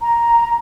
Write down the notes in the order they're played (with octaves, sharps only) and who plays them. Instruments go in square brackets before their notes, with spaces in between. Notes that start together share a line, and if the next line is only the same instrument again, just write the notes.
[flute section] A#5